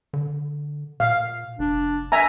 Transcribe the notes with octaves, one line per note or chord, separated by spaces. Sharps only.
D3
A#2 F5
F1 D4
E5 G#5 A#5